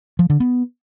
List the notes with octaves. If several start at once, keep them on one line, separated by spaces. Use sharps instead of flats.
F3
D3
B3